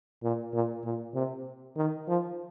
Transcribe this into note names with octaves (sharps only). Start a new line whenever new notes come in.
A#2
A#2
A#2
C3
D#3
F3